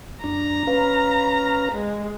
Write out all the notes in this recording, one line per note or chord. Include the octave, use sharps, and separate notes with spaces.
F#2 D4 A#5
C#4 B4 F5
G#3